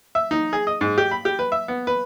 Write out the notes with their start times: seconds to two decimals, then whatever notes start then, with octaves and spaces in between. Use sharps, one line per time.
0.15 E5
0.31 D#4
0.53 G#4
0.67 D#5
0.81 G#2
0.98 G4
1.11 B5
1.25 G4
1.39 B4
1.52 E5
1.68 B3
1.87 B4